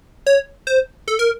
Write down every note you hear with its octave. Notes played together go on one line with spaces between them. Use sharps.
C#5
C5
A4
A#4